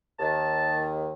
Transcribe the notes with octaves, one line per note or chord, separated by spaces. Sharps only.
D#2 D#3 A5